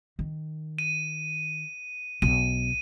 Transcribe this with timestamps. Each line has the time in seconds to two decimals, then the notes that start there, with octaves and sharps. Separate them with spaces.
0.19 D#3
0.78 D#7
2.22 B1 D#7